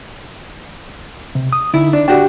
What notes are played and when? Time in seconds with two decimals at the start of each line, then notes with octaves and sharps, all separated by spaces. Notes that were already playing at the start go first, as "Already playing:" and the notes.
1.35 C3
1.53 D#6
1.74 D3 D#4 E4
1.93 D4
2.08 D4 F#4 G4 G5